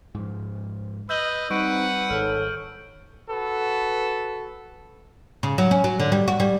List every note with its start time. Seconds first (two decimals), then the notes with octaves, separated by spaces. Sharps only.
0.14 G#2 F3
1.09 B4 D#5 E6 G6 F#7
1.50 G3 C4 D#4 B4 F#5 C#6 D7 D#7
2.10 G#1 G#2 A4 C#5 F6
3.29 F#4 A4 B4
5.43 C#3
5.58 F#3
5.71 C#4
5.84 F#3
6.00 D3
6.12 G3
6.28 F#4
6.40 G3